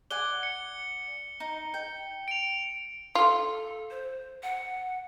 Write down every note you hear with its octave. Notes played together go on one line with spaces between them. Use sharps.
D5 F#5 G#5 G7
C#7
D#4
G5
D7 F7
F4 A4
C5
F#5